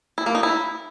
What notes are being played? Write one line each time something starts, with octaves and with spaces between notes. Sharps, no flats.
E4
A#3
D#4
E4